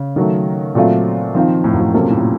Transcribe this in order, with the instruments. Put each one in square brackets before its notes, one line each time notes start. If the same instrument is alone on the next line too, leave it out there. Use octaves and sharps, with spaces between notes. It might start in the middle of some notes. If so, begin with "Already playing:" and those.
Already playing: [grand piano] C#3
[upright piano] D#3 F#3 A3
A#2 F#3 A3 C4 F4
[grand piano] D#3 [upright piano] F3 C4 F4
[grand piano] A2
F#2
A2
[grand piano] C3 [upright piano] F#3 A#3 C#4 F4 A4
[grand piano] A#2
A2
A#2